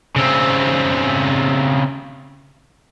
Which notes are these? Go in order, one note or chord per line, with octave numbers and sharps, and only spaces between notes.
C#3 C4